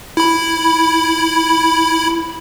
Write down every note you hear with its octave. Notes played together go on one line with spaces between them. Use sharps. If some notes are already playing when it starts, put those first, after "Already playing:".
E4 B5